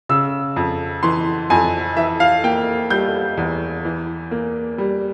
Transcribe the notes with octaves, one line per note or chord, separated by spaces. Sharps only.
C#3 E6
F2
E3 C6
F2 G#5
E3 E5
F5
A#3 G5
G3 G6
E2
E3
A#3
G3